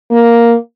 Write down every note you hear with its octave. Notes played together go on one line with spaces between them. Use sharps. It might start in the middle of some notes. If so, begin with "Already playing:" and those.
A#3